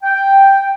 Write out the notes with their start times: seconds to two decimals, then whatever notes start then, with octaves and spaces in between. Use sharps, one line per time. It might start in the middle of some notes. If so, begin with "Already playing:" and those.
0.03 G5